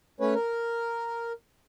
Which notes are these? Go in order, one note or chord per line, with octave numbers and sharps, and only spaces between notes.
A3 C#4 B4 C#5
A#4